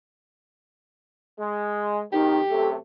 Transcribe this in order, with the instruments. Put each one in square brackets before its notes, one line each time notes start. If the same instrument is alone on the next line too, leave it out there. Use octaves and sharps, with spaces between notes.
[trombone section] G#3
[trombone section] F2 B2 D#3 [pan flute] D#4 [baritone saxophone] G4
[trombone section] F#2 C3 A3 [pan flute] A4